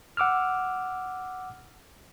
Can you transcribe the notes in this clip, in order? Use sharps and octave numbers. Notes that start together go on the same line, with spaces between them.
F#5 D6 E6 F6